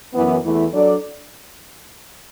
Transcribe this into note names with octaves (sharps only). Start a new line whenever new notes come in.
F#2 E3 B3
E2 E3 A3 E4
F#3 D4 A4 D5